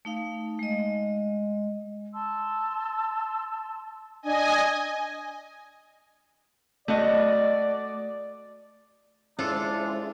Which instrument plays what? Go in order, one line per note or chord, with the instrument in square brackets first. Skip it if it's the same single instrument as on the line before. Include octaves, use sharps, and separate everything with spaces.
[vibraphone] A3 D#4 F5
G#3 D#5
[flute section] A5 C6 E6
[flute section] D4 [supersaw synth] D#5 G#5
[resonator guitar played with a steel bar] A3 F#4 D#5 [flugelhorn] D5
[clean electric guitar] G#3 C#4 [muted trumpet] D4 [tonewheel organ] E4 G#4 C5 [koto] F4 A4